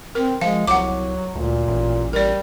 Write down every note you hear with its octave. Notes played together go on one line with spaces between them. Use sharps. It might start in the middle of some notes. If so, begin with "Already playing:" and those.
C4 A#4
F3 G#3 F5
C2 F#3 F#5 D6
D2 A#2
A1
G3 A#4 D5